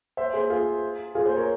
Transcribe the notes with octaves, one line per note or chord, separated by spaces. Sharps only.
C5 E5
G#4 C5
F4 G#4
F4 G#4
G#4 C5
A#4 C#5